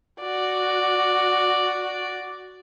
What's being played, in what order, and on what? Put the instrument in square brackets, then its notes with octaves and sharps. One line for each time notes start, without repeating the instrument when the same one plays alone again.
[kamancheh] F#4 D5